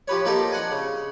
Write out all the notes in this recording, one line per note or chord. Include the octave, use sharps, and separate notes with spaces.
F3 G4 B4 C#5
F3 A#3 D#4 F4 G4 A4
D4 F#5 G#5
C#3